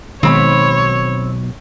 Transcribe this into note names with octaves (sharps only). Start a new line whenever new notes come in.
B1 B2 D#3 G#3 C4 C#5 B5